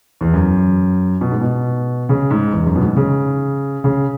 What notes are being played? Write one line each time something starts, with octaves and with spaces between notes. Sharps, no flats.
E2
F#2
B2
G#2
B2
C#3
G#2
E2
F#2
B2
G#2
C#3
C#3